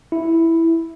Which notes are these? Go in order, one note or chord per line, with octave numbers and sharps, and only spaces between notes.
E4